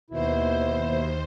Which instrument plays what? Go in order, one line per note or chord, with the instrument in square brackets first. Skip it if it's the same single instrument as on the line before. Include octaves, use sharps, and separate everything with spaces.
[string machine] D#2 C5 [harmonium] B2 E4